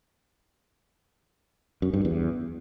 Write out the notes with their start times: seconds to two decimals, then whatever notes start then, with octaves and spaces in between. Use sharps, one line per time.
1.82 F#2
1.94 G2
2.05 E2